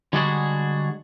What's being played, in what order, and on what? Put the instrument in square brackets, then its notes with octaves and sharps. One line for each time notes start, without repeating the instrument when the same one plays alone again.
[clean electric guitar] D3 G3 G#3 D4 F#4 G#4